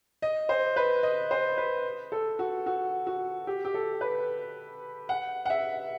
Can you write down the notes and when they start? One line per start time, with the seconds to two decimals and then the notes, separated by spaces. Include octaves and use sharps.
0.22 D#5
0.49 C5
0.76 B4
1.03 D#5
1.31 C5
1.58 B4
2.12 A4
2.39 F#4
2.66 F#4
3.07 F#4
3.47 G4
3.65 G4
3.74 A4
4.01 B4
5.09 F#5
5.46 F#5
5.50 E5